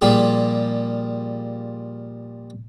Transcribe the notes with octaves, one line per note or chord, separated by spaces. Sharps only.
A#2 F3 G3 G4 G#4